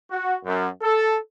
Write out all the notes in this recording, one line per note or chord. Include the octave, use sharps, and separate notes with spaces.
F#4
F#2
A4